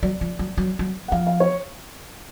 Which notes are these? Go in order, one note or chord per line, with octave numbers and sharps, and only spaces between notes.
F#3 D5
F3
F#3
F#3
F#3
F#5
F3 F5
F5
C#5